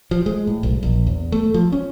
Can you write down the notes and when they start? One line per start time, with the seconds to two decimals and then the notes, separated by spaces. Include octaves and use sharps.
0.11 F3
0.26 G#3
0.47 A2
0.63 B1
0.83 A#1
1.07 E2
1.32 A3
1.54 F3
1.72 C#4